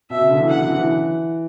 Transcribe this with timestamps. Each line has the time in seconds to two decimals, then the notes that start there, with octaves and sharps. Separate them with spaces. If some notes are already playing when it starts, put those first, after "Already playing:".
0.10 B2 E5
0.21 C#3
0.30 D3
0.39 E3
0.49 F#3 F#5
0.63 E3
0.76 E3